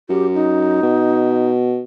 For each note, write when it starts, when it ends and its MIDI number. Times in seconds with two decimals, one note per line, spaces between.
0.09 0.78 42
0.09 0.27 67
0.34 1.49 63
0.82 1.82 47